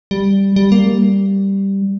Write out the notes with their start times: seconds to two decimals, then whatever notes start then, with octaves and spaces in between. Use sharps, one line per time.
0.11 G3
0.56 G3
0.72 A#3
0.87 G3